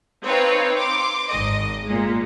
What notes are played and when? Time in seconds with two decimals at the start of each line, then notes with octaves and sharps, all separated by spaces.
0.24 C4 D#4 B4 C#5 F5 G5
0.76 C6 D6
1.28 G#1 D#5
1.84 A#2 G#3